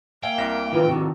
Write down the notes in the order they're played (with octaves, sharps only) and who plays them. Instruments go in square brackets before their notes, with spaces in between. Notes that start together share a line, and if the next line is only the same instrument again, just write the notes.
[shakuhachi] A#3 [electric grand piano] E5 F5 G#5 [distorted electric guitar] G5
[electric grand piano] C2 E5 A#6
[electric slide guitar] D#3 F4 B4
[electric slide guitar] C3 D#3 [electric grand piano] F#4 A4 [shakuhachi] G4